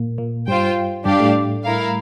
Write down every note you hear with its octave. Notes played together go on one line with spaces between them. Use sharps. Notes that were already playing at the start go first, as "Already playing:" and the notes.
Already playing: A#2 A#3
A#2 A#3
G2 G3 F4 C5 G5
G2 G3 D4 G4 D5 F5
A2 A3
E4 A#4 F5